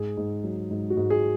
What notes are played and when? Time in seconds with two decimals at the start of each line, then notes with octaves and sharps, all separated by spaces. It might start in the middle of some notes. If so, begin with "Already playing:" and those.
Already playing: G#2 G#4
0.17 G#2
0.44 F#3
0.71 G#2
0.90 F#4
0.97 G#2
1.10 G#4